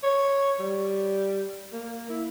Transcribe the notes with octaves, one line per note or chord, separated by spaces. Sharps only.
C#5
G3
A#3
E4